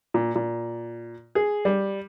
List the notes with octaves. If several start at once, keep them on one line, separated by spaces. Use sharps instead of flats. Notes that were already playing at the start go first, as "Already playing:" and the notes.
A#2
A#2
G#4
G3